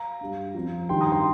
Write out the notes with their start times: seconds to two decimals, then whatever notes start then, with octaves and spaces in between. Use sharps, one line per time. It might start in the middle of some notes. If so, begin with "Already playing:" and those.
Already playing: F5 A#5
0.21 G2 G3
0.54 F2 F3
0.89 G2 D#3 G3 G5 C6
1.01 A#5 D#6
1.12 G5 C6